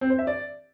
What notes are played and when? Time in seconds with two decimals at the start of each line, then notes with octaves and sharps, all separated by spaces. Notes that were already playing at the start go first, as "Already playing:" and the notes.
0.01 C4
0.10 C5
0.19 E5
0.27 D5